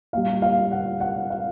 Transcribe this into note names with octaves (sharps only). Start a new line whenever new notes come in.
A#2 G3 F5
F5
F#5
F#5
F5